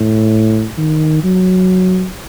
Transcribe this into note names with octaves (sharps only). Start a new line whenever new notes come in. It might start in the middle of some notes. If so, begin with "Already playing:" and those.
Already playing: A2
D#3
F#3